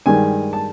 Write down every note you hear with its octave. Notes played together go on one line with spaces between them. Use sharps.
G2 D#3 G#3 G#5
A5